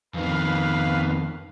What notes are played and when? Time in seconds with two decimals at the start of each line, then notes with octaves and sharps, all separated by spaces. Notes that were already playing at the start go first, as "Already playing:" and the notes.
0.14 F2 D#3 B4 F5